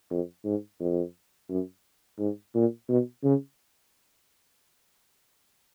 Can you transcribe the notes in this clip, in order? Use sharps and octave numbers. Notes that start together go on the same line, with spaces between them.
F2
G#2
F2
F#2
G#2
A#2
B2
C#3